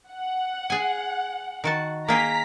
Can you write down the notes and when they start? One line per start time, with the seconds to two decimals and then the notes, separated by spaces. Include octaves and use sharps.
0.11 F#5
0.70 G#4 G#5
1.64 D#3 F#4 A5
2.08 A#3 G#4 G5 A#5 B6